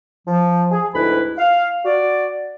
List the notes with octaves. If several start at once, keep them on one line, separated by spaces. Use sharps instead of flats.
F3
G#4
D2 G#2 E4 B4 B5
F5
F#4 D5